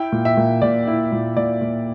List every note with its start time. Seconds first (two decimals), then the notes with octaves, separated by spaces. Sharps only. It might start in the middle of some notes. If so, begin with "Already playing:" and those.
Already playing: E4 G5
0.12 A#2
0.25 E5
0.37 A#2
0.62 A#2 D5
0.87 E4
1.12 A#2
1.37 A#2 D5
1.61 A#2